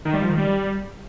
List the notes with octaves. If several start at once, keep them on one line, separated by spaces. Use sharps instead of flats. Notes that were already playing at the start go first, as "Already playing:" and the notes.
D#3
G3
F3
D#3
G3